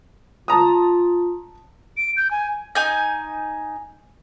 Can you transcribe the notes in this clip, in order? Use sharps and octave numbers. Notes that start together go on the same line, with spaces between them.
F4 A5 A#5 D#6
D7
G6
G#5
D#4 G#5 G6